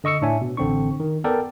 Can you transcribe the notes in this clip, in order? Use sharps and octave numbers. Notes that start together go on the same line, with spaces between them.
D3 D#5 C#6 E6 C#7
A2 D4 C#5 E5 G#5
B2
A1 D3 C4 D4 C#6
D#3
B3 A4 A#4 D5 G5